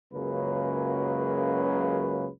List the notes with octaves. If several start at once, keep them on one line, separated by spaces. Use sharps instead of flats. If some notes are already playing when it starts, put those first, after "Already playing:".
C#2 F#2 C#3 F#3 A#3 B4